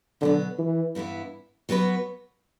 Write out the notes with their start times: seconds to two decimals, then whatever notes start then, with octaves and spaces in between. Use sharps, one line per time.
0.21 B2 D3 F#3 B3
0.59 E3
0.95 G2 E3 B3 E4
1.69 F#3 B3 F#4 B4